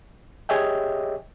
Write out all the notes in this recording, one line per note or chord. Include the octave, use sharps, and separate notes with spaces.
G4 G#4 C#5 D#5 E5 G5